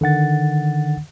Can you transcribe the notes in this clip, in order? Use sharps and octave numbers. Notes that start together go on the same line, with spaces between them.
D3 D#3 F#5 A6